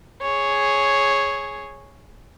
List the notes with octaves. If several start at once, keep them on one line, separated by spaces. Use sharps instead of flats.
G#4 C#5